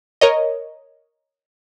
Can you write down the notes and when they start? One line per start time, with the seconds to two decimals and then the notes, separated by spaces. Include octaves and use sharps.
0.21 A#4 C#5 D#5